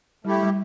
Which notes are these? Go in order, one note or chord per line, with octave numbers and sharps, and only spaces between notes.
G3 A3 E4 G4
G3